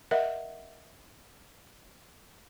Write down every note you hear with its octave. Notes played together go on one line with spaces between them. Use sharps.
A#4 D#5 E5 F#5